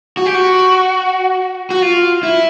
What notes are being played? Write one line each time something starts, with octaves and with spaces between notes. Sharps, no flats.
F#4
G4
F#4
F#4
F4
E4